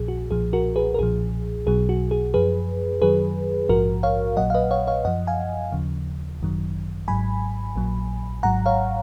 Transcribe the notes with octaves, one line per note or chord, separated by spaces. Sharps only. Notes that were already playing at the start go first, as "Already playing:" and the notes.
Already playing: A#1 A#2 F3 G#4
F#4
B1 A#2 F3 G#4
F#4 A#4
G#4 B4
A#4
B1 A#2 F3 G#4
B1 B2 F#3 G#4
F#4
G#4
F#2 F3 G#4 B4
F#2 D#3 F#3 G#4 B4
A#1 G#2 F3 F#4 A#4
C#5 F5
A#1 A#2 F#3 D#5 F#5
F5
B4 D#5
C#5 F5
C#5 F5
F#2 F3 D#5 F#5
F5 G#5
D#2 C#3 F3
G#1 F#2 D#3 F#3
G#1 G#2 F#3 G#5 B5
A#1 A#2 F#3
G#1 G#2 F#3 F#5 A#5
C#5 F5